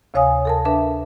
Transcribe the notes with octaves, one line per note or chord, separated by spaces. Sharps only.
D2 C3 C#5 F5 G#5 D#6
A4 A#4 A5
D4 A#4 B4 E5 A5